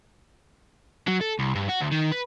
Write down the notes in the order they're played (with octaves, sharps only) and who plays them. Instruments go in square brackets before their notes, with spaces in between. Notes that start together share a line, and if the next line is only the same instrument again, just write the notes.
[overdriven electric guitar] F#3
A4
C2
G2
F#4
D2
D#3
B4